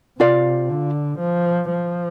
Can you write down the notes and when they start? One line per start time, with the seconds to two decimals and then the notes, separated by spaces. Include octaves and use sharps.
0.19 C3 F4 D5 F5
0.69 D3
1.19 F3
1.70 F3